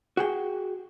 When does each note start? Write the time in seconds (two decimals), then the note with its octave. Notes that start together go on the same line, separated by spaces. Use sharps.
0.17 F#4 G#4 G5